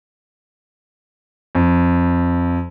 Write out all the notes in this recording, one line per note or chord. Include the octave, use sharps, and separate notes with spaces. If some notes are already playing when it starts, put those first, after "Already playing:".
F2